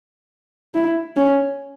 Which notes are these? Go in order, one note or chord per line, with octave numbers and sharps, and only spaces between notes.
E4
C#4